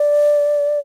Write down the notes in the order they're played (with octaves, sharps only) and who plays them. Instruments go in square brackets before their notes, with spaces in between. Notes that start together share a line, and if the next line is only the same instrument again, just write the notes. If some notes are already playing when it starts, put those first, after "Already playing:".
Already playing: [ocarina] D5